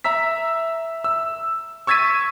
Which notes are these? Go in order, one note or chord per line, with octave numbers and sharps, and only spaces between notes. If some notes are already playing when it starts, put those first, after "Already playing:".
E5 A#5 E6 B6
E6
C#6 E6 G#6 A6 B6 D#7